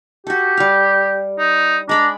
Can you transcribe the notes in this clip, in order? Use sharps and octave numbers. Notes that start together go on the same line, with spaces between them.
F#4 G4 A4
G3 F5
D#4
G#3 D4 A#5 B5 D6